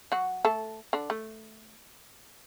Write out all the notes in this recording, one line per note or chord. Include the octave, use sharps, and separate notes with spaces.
F#3 F#4
A3 A4
D3 D4
A3